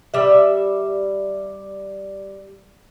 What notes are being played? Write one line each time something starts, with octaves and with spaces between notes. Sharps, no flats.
G3 E5